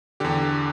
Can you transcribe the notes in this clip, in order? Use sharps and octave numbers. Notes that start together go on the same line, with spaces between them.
E2 D3 G4